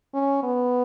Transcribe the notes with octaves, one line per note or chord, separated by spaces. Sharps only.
C#4
B3